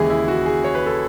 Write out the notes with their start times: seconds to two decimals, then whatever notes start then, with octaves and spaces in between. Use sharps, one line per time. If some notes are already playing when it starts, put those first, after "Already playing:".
Already playing: D#2 C#3 E3 G#3 G#4
0.10 E4
0.28 F#4
0.46 G#4
0.64 C#5
0.75 B4
0.86 A4